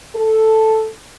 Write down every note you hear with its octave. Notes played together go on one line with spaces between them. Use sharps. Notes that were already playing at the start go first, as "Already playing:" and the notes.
A4